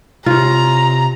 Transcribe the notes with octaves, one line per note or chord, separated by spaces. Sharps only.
C3 F4 C#5 A#5